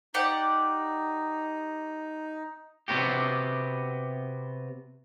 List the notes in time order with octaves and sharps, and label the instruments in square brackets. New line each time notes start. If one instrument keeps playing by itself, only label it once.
[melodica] D#4 [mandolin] G4 D5 F#5
[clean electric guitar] C3 B3 F#4 G4